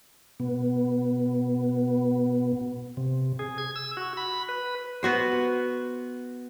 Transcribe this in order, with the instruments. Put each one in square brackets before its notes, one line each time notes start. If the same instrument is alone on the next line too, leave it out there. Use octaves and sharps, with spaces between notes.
[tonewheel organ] B2 B3
C3
G#4
G#6
E6
F#4
B5
B4
[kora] B3 F#4 C5